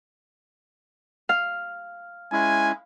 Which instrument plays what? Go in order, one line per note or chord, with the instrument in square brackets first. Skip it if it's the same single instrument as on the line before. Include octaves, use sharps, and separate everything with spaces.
[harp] F5
[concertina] G#3 C#4 E4 [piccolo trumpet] G#5